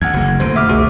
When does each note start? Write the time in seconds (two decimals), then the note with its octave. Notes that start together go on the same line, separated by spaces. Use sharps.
0.02 D2 F#5 G#6
0.14 F#1 A#3
0.40 F1 D2 B2 C5
0.56 E5 D6 F6
0.69 C2 F#4 G#4